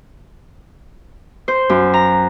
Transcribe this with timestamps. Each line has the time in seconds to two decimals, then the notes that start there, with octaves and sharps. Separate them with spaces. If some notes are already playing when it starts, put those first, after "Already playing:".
1.48 C5
1.69 F#2
1.94 A#5